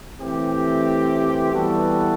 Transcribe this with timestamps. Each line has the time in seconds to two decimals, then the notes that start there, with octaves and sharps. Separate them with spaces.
0.21 E3 A3 C4 G4
1.53 E3 G3 B3 F#4 A4